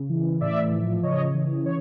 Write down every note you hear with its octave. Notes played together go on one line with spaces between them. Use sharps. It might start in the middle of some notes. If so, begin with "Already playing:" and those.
Already playing: C#3
E3
A2 D5 E5
F3
C#3 C#5 D#5
E3
C#5